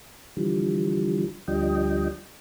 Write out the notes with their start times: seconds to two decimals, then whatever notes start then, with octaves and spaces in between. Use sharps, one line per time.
0.37 D3 E3 F3 G3
1.48 D2 F3 G3 D4 D#5 G5